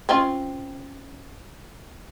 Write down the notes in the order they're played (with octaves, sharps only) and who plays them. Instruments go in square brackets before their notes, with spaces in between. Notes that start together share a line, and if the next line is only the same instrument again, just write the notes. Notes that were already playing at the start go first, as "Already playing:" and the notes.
[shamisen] C4 C#4 F4